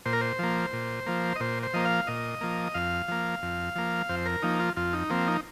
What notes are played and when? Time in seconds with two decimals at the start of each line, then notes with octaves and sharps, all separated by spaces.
0.06 A#2 C5
0.13 A#4
0.21 C5
0.39 F3 A#3
0.73 A#2
1.06 F3 A#3
1.36 D#5
1.40 A#2 C5
1.63 C5
1.74 F3 A#3 D#5
1.85 F5
2.07 A#2 D#5
2.41 F3 A#3
2.74 F2 F5
3.08 F3 A#3
3.43 F2
3.76 F3 A#3
4.09 F2 C5
4.26 A#4
4.43 F3 A#3 D#4
4.60 F4
4.77 F2 F4
4.93 D#4
5.10 F3 A#3 C4
5.28 D#4